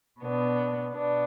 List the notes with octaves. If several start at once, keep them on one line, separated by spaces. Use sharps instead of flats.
B2 B3 D4
B2 B3 D4